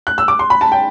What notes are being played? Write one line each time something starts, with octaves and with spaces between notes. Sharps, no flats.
F#6
E6
D6
C6
B5
A5
G5